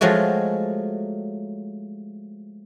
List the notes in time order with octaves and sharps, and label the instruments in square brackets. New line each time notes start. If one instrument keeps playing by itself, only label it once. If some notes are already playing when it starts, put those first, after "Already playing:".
[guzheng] F3 F#3 G#3 A3 F#4